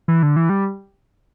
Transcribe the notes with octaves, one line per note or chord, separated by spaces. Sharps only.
E3
D3
E3
G3